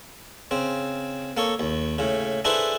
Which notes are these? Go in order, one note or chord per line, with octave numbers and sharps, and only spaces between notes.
C#3 C4
A#3 A4 C#5
D#2
A2 C#3
D4 E4 G#4 A4 B4 C5